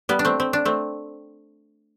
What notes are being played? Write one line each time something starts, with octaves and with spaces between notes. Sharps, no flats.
G3 B3
D4
A3 C4
C4
D4
A3 C4